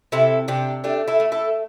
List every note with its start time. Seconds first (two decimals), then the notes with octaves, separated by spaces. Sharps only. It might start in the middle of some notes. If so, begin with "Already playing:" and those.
0.12 C3 E4 A4
0.48 C3 D4 G4
0.84 A3 D4 G4
1.07 E4 A4
1.20 A3
1.32 E4 A4